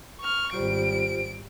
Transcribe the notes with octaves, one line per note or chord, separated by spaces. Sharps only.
C#6 F6
G#1 G3 F4 G4 C5 D7